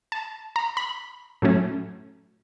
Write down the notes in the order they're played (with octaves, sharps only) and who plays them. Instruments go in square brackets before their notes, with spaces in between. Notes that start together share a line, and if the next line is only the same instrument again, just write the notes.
[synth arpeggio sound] A5
A#5
B5
A2 F#3 A3 C#4